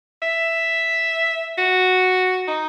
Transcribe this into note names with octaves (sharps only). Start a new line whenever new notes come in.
E5
F#4
D#4